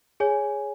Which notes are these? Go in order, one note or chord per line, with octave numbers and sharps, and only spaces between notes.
G#4 C#5 G#5